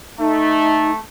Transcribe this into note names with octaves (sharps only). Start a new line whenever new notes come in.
A3 D#4